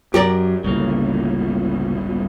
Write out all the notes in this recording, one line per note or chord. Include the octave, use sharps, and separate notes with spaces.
F#2 G4 A#4 D5
G1 C#2 A2 C#3 A#3